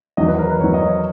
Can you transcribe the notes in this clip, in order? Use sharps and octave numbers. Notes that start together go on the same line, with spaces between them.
E2 D#3 F#3 D#5
B4
A#4
B4
E2 D#3 F#3 C#5
D#5
C#5